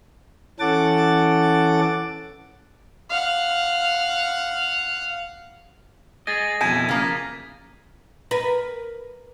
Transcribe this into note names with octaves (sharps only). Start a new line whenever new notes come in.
E3 C#4 A4 F#5 D6 A6
F5 F#5
G#4 D#5 A6 A#6
F2 B2 E4 G#5 G6 G#6
C#3 F3 A#3 A#6 B6
A#4 B4